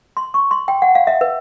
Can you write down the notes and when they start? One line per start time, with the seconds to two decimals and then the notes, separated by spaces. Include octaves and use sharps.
0.17 C6
0.34 C#6
0.51 C6
0.68 G5
0.82 F#5
0.95 F5
1.07 E5
1.21 B4